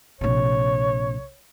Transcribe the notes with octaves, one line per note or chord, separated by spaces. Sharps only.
A#1 C3 C#5